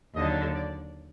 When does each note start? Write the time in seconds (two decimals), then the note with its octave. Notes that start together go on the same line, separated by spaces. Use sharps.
0.15 D#2 D3 F#3 D#5
0.53 D5